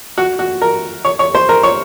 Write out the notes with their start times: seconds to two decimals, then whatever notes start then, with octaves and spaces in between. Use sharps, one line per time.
0.18 F#4
0.39 F#4
0.62 A#4
1.05 C#5
1.19 C#5
1.35 C5
1.49 A#4
1.63 C#5